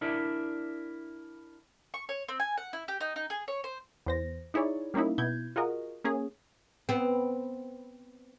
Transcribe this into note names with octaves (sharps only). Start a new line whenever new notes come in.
D4 E4 A#4 D5 E5
C#6
C#5
C4
G#5
F#5
E4
G4
D#4
D#4
G#4
C#5
C5
E2 C5 A#6
D#4 E4 G#4 C#5 D5
G3 A#3 C#4 D#4 E4
B2 E4 G6 G#6
F4 F#4 G#4 A#4 D#5
A#3 C#4 G#4
B3 C4